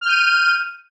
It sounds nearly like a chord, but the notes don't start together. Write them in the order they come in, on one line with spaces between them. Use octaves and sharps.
F6 G6 D#7